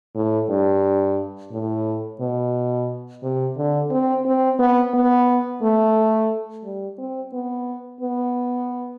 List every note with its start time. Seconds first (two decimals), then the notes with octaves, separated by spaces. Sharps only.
0.15 A2
0.49 G2
1.52 A2
2.20 B2
3.22 C3
3.57 D3
3.90 C4
4.25 C4
4.59 B3
4.94 B3
5.62 A3
6.64 G3
6.98 C4
7.33 B3
8.01 B3